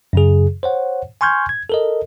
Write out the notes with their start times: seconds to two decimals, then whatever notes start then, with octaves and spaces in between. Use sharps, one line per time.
0.13 F#2 C#3 G#4
0.63 C5 C#5 F#5
1.21 G#5 C6 C#6 F6 G6 G#6
1.49 G#6
1.70 A4 A#4 D#5